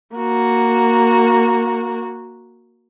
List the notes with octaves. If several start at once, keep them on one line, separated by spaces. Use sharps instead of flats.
A#3 F#4